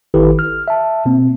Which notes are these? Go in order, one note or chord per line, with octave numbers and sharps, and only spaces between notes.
G#1 D#3 E4 G4 A4 B4
F6
E5 A5
B2 A#3 C4